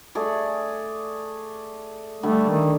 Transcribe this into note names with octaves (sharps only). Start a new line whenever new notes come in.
A3 G#4 D5
D3 G3 A3
D#3